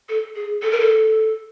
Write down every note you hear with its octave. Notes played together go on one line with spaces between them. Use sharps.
A4
G#4
A4
A#4
A4